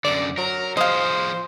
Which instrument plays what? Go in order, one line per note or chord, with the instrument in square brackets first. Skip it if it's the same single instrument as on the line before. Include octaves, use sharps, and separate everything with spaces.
[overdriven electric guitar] F#2 D3 [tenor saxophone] D5
[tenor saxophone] F#3 [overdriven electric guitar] A#4
[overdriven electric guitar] F3 G#4 [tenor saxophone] C5 [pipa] D#5 F5